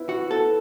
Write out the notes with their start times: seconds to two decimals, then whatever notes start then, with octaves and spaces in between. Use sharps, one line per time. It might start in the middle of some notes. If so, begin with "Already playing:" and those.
Already playing: B3 E4
0.09 F#4
0.31 B3 A4